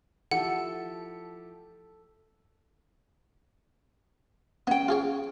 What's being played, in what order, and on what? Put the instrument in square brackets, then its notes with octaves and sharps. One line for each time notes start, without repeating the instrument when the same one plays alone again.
[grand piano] F3 E4 G4 [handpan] A4 [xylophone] F#5
[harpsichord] B3 [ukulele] C#4 G5
[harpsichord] F4 G#4 C#5